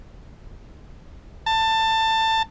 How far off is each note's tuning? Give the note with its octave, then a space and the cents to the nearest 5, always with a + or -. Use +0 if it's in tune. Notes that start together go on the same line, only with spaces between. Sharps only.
A5 +20